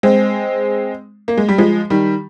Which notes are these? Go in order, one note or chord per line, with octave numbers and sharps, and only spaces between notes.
G#3 C4
A#3
G#3
G3
F3 G#3
D#3 G3